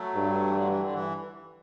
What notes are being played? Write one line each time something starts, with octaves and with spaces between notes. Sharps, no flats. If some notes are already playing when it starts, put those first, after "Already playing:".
Already playing: F#3 A3
G2
E3
D3 F#3
E3
D3
E3